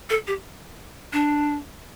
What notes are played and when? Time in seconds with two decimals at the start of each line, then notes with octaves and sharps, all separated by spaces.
0.10 A4
0.27 G4
1.13 D4